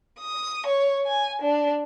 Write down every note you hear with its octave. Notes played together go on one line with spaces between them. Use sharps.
D#6
C#5
G#5
D4